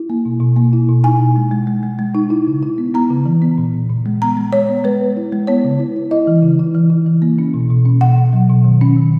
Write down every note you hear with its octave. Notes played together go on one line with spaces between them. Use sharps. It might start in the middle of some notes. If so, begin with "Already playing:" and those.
Already playing: E4
A#3
B2
B2
A#3
E4
B2
D#4 G#5
B2
G#3
G#3
G#3
G#3
G#3
D#4
E4
C#3
E4
B3
B3 A#5
C#3
E3
B3
A#2
A#2
A#2
G#3
B3 A#5
G#3
G#3 C#5
B3
G#3 B4
B3
E4
G#3
B3 C#5
C#3
E4
E4
E4 D#5
E3
C#3
E4
E3
E4
E3
A#3
C#4
B2
B2
C#4
B2 F#5
B2
F#3
B2
D#3
C#4
D#3